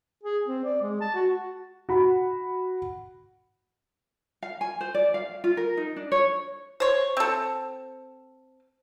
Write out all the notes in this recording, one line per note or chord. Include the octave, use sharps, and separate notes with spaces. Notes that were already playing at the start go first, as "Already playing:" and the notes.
G#4
C4
D5
G#3
A5
F#4
F#4 B5
F5
G#5
C5
D5
F5
F4
A#4
D#4
D4
C#5
C5 C#5
C4 A4